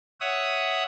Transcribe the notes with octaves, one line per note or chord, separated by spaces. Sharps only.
C#5 E5 F#5 D#6